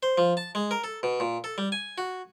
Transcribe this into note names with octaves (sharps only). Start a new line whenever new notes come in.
C5
F3
A5
G#3
A#4
A4
B2
A#2
A4
G3
G#5
F#4